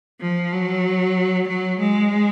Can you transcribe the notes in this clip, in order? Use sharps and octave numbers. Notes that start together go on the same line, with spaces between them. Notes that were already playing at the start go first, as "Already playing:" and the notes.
F3
F#3
F#3
G#3